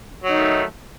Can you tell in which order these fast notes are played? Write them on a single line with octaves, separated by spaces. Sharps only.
F#3 D#4 D#3 A3